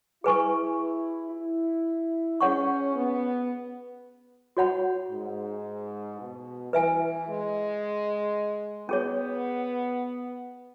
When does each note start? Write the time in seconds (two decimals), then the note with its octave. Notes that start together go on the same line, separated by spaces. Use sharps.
0.24 E4 G#4 B4 G#5 C#6
1.33 E4
2.41 C#4 G#4 C#5 F#5 C#6
2.95 B3
4.57 F#4 C#5 F#5 B5
5.11 G#2
6.19 B2
6.73 E3 B4 E5 G#5
7.28 G#3
8.89 B3 C#4 G#4 C#5